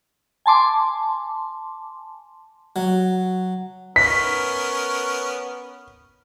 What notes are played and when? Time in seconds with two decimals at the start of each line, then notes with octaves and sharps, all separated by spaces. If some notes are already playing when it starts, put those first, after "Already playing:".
0.46 G#5 A5 C6 D6
2.76 F#3
3.96 B3 C#4 A#4 B6